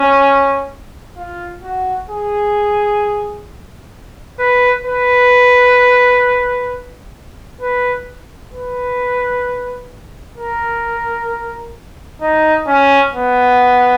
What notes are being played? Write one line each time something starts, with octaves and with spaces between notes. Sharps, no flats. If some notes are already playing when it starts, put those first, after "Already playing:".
Already playing: C#4
F4
F#4
G#4
B4
B4
B4
B4
A#4
D#4
C#4
B3